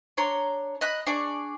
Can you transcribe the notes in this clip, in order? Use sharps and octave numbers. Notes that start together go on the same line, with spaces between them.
D4 C#5 A#5 C6
D#5 B5 F#6
D4 G#4 D5 C#6